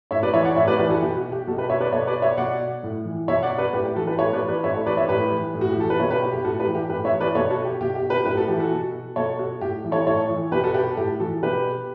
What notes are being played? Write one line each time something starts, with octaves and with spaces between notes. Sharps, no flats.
A2 C#5 E5
B4 D5
E3 C#5 E5
D5 F#5
A2 C#5 E5
B4 D5
E3 G4 B4
F#4 A4
B2 G4
F#4
G4
B2 F#4 A4
G4 B4
C#5 E5
B4 D5
B2 A4 C#5
B4 D5
C#5 E5
B2 D5 F#5
A2
E3
B2 C#5 E5
D5 F#5
B4 D5
A2 G4 B4
G4
E3 F#4 A4
G4 B4
A2 A4 C#5
B4 D5
E3
B4 D5
A2 C#5 E5
A4 C#5
E3 B4 D5
C#5 E5
A2 G4 B4
E3
A2
F#4
G4
E3 A4
B4
B2 A4 C#5
G4 B4
G4
G4
A2 F#4 A4
G4 B4
E3
G4
A2 G4 B4
C#5 E5
E3
B4 D5
B2 A4 C#5
F#4 A4
G4
B2 G4
G4
G4 B4
A2 G4 B4
F#4 A4
E3 G4
F#4 A4
B2
B2 A4 C#5
F#4 A4
A2 G4
E3
A4 C#5
A2 A4 C#5
E3
B2 G4 B4
F#4 A4
G4 B4
A4
A2 G4
E3 F#4 A4
B2 G4 B4